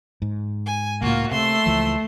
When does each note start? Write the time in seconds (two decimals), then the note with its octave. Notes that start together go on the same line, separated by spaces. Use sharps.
0.22 G#2
0.66 G#5
1.02 C#2 A2 A#3 F4 F#4
1.31 C3 A3 C6 E6
1.66 C#2 E3 F3